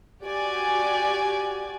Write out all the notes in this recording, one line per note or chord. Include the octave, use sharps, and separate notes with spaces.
F#4 G4 D5 G#5